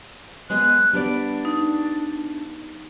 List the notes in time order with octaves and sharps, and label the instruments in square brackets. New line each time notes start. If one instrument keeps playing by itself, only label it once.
[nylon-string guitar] G#3 B3 D#5 [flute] F#6
[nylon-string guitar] G3 B3 D5 [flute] D4
[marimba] D#4